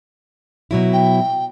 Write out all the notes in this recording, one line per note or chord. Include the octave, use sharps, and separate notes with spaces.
B2 F#3 E4
G5